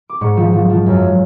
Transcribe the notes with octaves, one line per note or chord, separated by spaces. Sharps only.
D6
G#2 C#6
F3
F3
F3
F#2